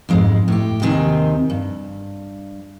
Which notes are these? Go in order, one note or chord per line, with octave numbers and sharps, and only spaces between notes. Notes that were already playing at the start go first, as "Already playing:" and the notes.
F2 G#2 G#3
A2 G4
D#2 C3 D#3 C4 G#5
G2